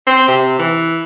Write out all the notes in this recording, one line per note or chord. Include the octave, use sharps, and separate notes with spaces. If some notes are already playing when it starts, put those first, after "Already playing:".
C4
C3
E3